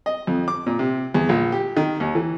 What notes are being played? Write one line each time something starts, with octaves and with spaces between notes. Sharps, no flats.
D#5
F2
D6
A#2
C3
E2
A#1
G4
D#3
D#2
E3